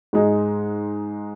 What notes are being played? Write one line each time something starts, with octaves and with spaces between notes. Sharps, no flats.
G#2 G#3 D#4